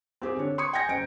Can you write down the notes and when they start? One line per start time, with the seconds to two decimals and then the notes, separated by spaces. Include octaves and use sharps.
0.22 C4 G4 G#4
0.37 D3 D4 C#5
0.58 C6 C#6 D#6 G#6 C#7
0.73 G5 G#5 G6 G#6 A#6 C#7
0.88 F#1 D7